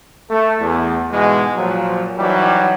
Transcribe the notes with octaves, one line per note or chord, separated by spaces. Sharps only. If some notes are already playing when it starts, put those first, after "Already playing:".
A3 A4
E2
G#2 B2 E3 G#3
A#2 F3 F#3
E3 F#3 G3 D#4 G4